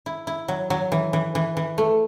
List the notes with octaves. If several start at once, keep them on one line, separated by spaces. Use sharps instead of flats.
E4
E4
F#3
F#3
E3
E3
E3
E3
A3